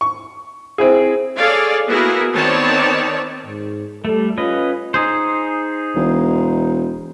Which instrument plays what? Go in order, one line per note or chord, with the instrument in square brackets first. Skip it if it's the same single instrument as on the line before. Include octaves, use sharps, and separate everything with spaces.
[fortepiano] C#6
C4 E4 G#4
[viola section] G#4 A4 C#5 D5 F5
A#3 B3 E4 F#4 G#4 A#4
D#3 B3 C4 C#5 D5 A5
[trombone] G#2
[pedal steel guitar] G3 A3 [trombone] A4
[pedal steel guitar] C#4 B4 D#5 [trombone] F4
[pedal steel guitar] D#4 G#4 C5
[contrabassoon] E1